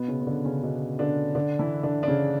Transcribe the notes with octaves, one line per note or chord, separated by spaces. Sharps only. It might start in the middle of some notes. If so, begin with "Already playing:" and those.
Already playing: B2 B3
C#3 C#4
C#4
D3 D4
C#3 C#4
B2 B3
D3 D4
D3 D4
E3 E4
D3 D4
D4
C#3 C#4